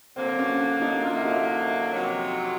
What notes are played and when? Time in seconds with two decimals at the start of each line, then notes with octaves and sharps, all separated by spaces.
0.16 D3 F#3 A#3 C4
0.39 C#4
0.59 D4
0.82 D#4
1.03 D3 F#3 A#3 F4
1.15 E4
1.25 D#4
1.35 E4
1.91 F2 C3 D#3 F#3